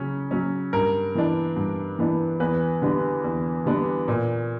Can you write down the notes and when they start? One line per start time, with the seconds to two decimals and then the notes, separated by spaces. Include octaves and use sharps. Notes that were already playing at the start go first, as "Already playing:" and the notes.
Already playing: C#3 F#3 C#4
0.31 F#3 C#4
0.73 G2 A#4
1.15 E3 B3 D4
1.56 G2
1.99 E3 B3 D4
2.40 E2 B4
2.82 D3 G3 B3 D4
3.24 E2
3.66 D3 G3 B3 D4
4.08 A#2